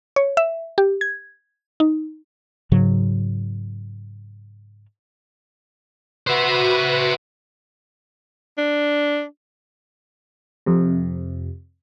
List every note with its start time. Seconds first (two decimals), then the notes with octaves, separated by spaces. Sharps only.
0.16 C#5
0.37 E5
0.78 G4
1.01 G#6
1.80 D#4
2.72 G#2 C#3 F#3
6.27 F#4 B4 C5 E5
8.58 D4
10.66 F2 C3